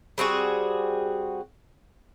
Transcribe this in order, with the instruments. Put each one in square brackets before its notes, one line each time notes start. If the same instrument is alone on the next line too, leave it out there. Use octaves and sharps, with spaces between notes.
[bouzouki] G3 C4 F#4 G#4